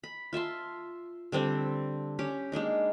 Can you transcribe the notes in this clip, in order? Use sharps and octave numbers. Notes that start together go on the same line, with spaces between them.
B5
F4 E5 A5 C6
D3 G3 C4 D4
C#4 G4 D6
G#3 A#3 D4 D#4